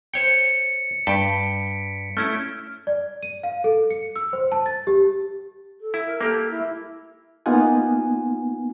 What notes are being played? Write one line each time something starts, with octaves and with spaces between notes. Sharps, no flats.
C5 C#5 G5 C#7
G2 G5 A5 B6 D7
A3 C#4 E4 F6
D5
D#7
F5
A4
C#7
E6
C5
A5
A6
G4
A4
E4
A#4
A#3 G4 A4
E4
A#3 B3 D#4 F4 F#5 G#5